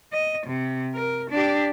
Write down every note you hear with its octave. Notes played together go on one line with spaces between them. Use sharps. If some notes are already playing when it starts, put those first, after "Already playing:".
D#5
C3
A#4
D4 G4